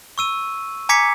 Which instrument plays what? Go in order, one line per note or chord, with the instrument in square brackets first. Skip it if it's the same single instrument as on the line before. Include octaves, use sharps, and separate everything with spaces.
[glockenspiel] C#6 E6 D#7
G#5 A#5 D6 G#6 B6 C#7